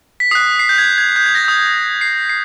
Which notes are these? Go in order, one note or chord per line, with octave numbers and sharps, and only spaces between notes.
B6
D#6 F#6 C7
C7
G6
G#6
G#6
G6
G#6
A#6
D#6 G6
C7
C7